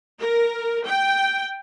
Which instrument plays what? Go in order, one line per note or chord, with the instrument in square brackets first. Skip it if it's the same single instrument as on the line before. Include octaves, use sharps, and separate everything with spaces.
[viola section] A#4
G5